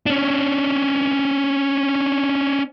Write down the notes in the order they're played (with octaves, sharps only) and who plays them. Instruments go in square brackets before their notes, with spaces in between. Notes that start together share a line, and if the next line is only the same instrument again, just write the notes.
[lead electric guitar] C#4 D4